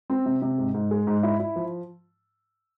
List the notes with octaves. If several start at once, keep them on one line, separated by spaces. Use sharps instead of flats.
C4
C3
C3
G#2
G#2
G#3
G#2
E4
E4
F3